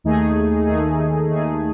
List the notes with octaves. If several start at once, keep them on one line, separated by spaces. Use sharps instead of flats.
D#2 D#3 A3 D#4 G#4
D#2 D#3 A3 D#4 G#4
D#2 D#3 A3 D#4 G#4